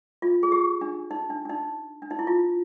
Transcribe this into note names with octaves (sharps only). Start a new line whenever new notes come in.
F4
G#4
G4
D4
D#4
D4
D4
D#4
D4
D#4
E4
F4